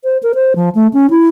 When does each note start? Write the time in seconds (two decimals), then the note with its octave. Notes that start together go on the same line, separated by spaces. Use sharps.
0.04 C5
0.23 A#4
0.35 C5
0.56 F3
0.75 A3
0.93 C#4
1.10 E4